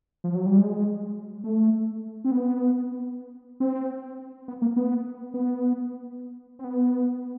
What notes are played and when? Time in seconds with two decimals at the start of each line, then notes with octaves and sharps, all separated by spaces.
0.24 F3
0.35 F#3
0.46 G3
0.58 G#3
1.44 A3
2.24 C4
2.32 B3
3.60 C4
4.48 B3
4.62 A#3
4.76 B3
5.34 B3
6.59 C4
6.64 B3